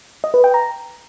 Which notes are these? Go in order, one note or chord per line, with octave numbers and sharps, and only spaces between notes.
D#5
B4
G5
A#5